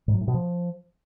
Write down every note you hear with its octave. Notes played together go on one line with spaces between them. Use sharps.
G#2
F#3
A2
B2
F3